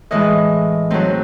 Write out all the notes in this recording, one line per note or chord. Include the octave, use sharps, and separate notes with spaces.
A2 E3 G#3 D#5
F#3 A3 C4 D#4